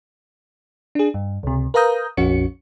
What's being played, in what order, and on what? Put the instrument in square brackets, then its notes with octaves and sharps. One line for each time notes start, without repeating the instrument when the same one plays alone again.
[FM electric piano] D4 G#4
G2
C#2 C3
A#4 B4 F5 A#5 D#6 G6
A#1 F2 C#4 F#4 C#5 C#7